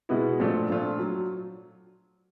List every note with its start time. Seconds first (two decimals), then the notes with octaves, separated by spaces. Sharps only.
0.09 B2 G#3 B3 E4
0.39 A#2 F3 A3 D4 F4
0.69 A#2 F3 A3 D4 F4
0.99 F#3